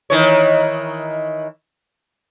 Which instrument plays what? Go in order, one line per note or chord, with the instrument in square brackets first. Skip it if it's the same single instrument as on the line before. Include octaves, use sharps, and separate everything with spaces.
[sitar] D#3 E3 C#5